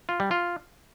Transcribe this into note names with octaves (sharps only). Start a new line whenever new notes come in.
F4
G3
F4